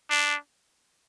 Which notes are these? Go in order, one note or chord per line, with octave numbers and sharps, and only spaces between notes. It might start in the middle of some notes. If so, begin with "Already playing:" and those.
D4